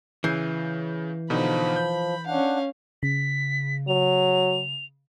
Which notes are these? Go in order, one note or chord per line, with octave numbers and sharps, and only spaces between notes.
C#3 E3 G6 C7
B2 D3 F3 D#4 B5
G6
C#4 D4 F5 F#5
C#3 B6
F#3 F7